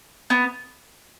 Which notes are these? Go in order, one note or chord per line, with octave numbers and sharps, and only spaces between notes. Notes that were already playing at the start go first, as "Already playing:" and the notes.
B3